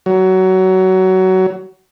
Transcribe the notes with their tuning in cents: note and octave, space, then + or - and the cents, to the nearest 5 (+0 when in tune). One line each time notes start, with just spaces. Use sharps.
F#3 +20